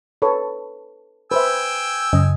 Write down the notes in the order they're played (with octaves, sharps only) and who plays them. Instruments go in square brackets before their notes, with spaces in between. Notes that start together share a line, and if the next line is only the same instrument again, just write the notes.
[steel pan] A4 B4 C#5
[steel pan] B4 C5 E5 [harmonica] G5 G#5 E6
[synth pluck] F#2 C#3 [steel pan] D#5